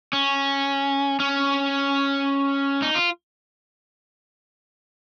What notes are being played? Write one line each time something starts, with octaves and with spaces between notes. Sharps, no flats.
C#4
C#4
D#4
F4